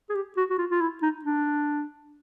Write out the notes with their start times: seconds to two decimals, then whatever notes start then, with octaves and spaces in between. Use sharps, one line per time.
0.09 G#4
0.15 G4
0.37 F#4
0.50 F#4
0.58 F4
0.70 F4
0.81 E4
1.02 D#4
1.24 D4